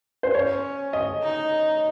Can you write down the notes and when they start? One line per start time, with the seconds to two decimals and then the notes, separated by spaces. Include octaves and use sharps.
0.23 C5
0.34 C#4 C#5
0.93 D#5
1.23 D#4